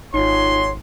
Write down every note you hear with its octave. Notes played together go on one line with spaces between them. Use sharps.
G#1 D#4 F4 F#4 G#4 C#5 C6